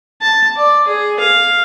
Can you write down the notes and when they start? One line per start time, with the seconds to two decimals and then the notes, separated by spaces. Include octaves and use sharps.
0.21 A5
0.57 D5
0.87 G#4
1.20 F5